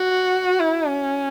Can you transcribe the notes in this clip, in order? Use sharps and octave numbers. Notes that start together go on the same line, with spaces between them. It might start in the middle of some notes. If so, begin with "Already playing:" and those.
Already playing: F#4
E4
C#4